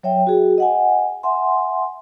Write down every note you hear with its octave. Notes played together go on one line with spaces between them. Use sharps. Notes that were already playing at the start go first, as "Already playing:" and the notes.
F#3 C#5 E5 G5
F#4 G#4
D#5 F#5 G#5
E5 F#5 G#5 C6